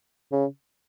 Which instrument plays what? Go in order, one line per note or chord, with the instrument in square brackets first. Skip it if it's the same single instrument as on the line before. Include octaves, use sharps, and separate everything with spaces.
[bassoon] C#3